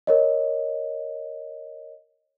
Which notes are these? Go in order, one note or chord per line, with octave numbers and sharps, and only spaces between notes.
A#4 C#5 D#5